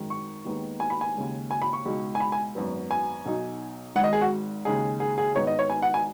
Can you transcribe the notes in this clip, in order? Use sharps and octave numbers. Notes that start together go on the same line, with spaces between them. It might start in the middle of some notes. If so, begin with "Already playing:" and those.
Already playing: G#1 F#2 D#3 G#3
C#6
D#2 D#3 G#3 B3 D#4
G#5
B5
G#5
D#2 C#3 G#3
G#5
B5
C#6
C#2 B2 G#3 D#4
G#5
B5
G#5
G#1 F#2 F#3 B3
G#5
B1 B2 F#3 D#4
G#1 G#2 D#3 F#5
D#5
G#4
F#4
D#2 C#3 G#3 D#4 G#4
G#4
G#4
G#1 G#2 D#3 B3 D#4 C#5
D#5
C#5
G#5
F#5
G#5